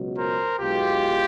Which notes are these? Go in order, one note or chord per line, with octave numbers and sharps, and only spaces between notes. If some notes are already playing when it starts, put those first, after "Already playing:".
Already playing: C#2 B2 F#3
A#4 C5
B1 B2 G#3 F4 G4